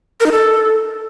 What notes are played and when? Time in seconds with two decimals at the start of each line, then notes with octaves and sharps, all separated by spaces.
0.20 A#4
0.26 D#4
0.32 A4